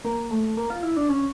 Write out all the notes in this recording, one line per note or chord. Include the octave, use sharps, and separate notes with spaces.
A#3
A3
A#3
F4
E4
D4
C#4